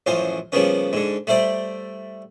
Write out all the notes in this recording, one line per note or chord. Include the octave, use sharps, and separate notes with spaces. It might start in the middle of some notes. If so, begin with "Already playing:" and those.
A1 F#2 F3 C5 F5 G#5
C#3 F3 G3 A#3 B3 C#4
G#2 D3
G3 A3 E4 C5 D5